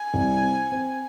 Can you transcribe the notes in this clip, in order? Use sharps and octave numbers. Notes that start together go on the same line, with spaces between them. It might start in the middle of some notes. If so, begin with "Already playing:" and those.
Already playing: G#5
C2
C4
C4